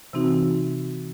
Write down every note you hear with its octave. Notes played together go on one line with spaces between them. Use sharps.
C3 E3 C4 D#4 F#4